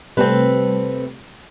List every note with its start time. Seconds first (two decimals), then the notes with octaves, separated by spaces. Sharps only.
0.17 C3 G3 A3 C4 A4 B4